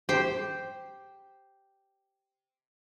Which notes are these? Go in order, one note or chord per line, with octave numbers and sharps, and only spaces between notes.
G4 C5